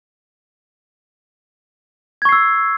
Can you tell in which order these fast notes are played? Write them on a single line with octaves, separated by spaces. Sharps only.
G#6 C#6 C7 E6